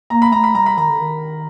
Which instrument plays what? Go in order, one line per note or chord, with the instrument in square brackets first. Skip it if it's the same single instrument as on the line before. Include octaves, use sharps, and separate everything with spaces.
[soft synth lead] A#3 [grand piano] A#5
[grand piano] B5
[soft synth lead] A3 [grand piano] A#5
[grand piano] B5
[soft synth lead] G3 [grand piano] A#5
[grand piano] B5
[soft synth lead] D#3 [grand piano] A#5
[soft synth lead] D3
D#3